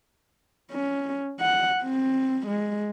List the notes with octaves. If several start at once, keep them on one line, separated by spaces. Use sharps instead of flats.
C#4
F#5
C4
G#3